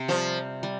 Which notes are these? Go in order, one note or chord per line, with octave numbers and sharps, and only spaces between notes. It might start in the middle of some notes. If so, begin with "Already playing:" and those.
Already playing: C3 C4
F3 G3
G3